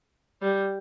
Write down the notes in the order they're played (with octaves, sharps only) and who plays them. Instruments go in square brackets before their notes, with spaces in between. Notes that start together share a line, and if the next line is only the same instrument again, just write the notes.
[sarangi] G3